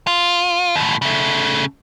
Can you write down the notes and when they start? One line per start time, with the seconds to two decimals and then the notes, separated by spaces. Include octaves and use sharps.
0.07 F4
0.76 D#2 A2
1.02 C#3 A3